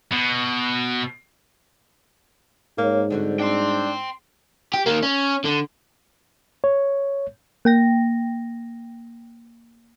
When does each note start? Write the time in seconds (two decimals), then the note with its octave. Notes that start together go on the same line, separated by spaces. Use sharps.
0.12 B2
2.78 G#2 A#3 C#4
3.10 D3 G3 C4 F#4
3.40 D4 G5 C6
4.74 G4
4.86 D#3 A#3
5.03 C#4
5.45 D3
6.64 C#5
7.65 A#3 G5 A#6